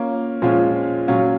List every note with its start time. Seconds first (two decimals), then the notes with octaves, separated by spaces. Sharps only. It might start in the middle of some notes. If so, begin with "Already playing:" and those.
Already playing: A#3 C#4 F4
0.42 A#2 F3 G#3 C#4 F4
1.08 A#2 F#3 C#4 F4